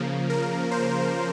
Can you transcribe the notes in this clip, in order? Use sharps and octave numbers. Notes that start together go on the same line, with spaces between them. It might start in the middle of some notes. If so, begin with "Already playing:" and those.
Already playing: C#3 F3 A#3
A#4
C5